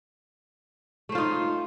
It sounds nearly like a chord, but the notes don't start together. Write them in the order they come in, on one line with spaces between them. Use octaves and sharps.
A3 C5 F4 D#4